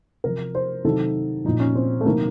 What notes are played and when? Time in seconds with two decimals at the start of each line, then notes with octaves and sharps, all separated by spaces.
0.24 C3 F3 A#4
0.55 C5
0.85 C3 D#3 F#3 A4
1.45 A#2 F3 D#4
1.60 C#4
1.75 C4
2.01 A3
2.05 C3 D#3 F#3 A#3